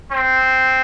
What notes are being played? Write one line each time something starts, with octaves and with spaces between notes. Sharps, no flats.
C4